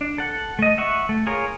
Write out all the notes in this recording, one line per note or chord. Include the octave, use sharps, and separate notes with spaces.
D4
A4 F#5
A3 D#5
E5 F#5 C#6
A3
F4 G#4 A#4 C#5